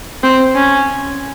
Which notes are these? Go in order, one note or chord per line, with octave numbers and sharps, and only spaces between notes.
C4
C#4